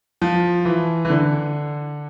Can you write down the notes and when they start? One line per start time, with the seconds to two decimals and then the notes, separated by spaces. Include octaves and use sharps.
0.22 F3
0.65 E3
1.05 E3
1.10 D3